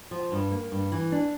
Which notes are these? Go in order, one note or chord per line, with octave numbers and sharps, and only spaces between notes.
F3
G2
A#3
G2
E3
D4